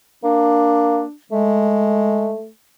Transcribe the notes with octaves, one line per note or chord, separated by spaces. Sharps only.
A#3 D4
G#3 A3